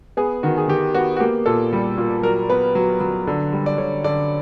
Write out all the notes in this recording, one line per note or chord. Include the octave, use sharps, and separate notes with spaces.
B3 G#4
D#3 F#4
G#4
D#3 G4
B3 F#4
F#4
A#3 G4
A#2 A4
G3
A#2
F#3 A#4
B3 B4
F#3
F#3
D3
G3
D5
D3 C#5
D3 D5